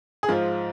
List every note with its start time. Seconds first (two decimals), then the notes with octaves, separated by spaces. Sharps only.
0.23 G#4
0.29 G#2 F3 F4